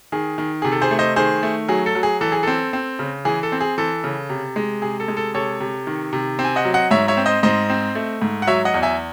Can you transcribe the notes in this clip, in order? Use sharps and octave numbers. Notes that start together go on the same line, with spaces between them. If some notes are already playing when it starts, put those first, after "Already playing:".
D#3 G#4
D#3
C3 G#4
A4
G#4 C5
A3
C5 D#5
D#3 G#4 C5
A3
F#3 G#4
A4
F#3
G#4
E3 A4
G#4
C4 A4
C4
C#3
E3 G#4
A4
C4
G#4
E3 A4
C#3
C3
G#3
C3 G#4
A4
G#3
A4
C3 A4 C#5
C3
D#3
C3
C4
G#5
D#5 F#5
F#3
D#5 F#5
G#2 C#5 E5
C#5 E5
C4
C5 D#5
G#2 C5 D#5
C4
A3
G#2
F#5
F#3 C#5 E5
D#5 F#5
E2
E5 G#5